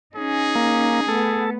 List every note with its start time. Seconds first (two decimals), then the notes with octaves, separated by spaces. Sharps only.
0.16 C#4 D#4 G#4
0.55 A#3
1.08 A3 B3 A4